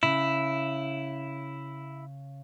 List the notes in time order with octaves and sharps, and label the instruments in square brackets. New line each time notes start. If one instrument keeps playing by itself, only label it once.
[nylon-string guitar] C#3 [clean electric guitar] E4